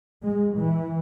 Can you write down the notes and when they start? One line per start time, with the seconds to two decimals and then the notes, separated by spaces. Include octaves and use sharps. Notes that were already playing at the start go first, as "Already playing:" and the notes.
0.23 G#3
0.55 E3